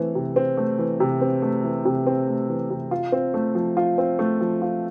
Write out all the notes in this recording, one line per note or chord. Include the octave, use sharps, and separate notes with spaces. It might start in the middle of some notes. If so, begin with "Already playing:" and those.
Already playing: E3 A3 C4
C3
C4
A3
E3
C3
C4
A3
E3
C3
C4
A3
E3
C3
F4
C4
A3
F3
F4
C4
A3
F3
F4